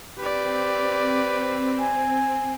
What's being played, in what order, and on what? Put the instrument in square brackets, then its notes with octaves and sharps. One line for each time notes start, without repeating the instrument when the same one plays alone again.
[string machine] C4 [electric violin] G4 D5 [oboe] B4
[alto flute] G#5